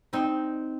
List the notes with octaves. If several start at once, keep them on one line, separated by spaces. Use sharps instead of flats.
C4 D#4